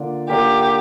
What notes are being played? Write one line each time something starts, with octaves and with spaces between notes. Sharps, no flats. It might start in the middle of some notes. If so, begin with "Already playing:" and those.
Already playing: D3 A#3 F4 D5
D3 A#3 F4 G4 D5